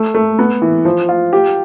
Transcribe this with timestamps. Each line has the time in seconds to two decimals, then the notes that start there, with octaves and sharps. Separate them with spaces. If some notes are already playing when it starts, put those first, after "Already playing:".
Already playing: A3
0.14 A3
0.39 B3
0.62 E3
0.85 F3
1.09 F4
1.33 G4